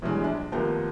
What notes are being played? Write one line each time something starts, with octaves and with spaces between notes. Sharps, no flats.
B1 E3 G3 G#3 D4
A#1 D4
D#2 F3 A3 B3 A#4 C5